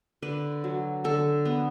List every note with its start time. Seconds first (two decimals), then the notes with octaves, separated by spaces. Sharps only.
0.22 D3 B4
0.64 F#3
1.04 D3 A4
1.45 B3